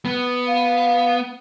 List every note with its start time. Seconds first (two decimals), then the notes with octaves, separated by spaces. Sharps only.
0.05 B3
0.46 F5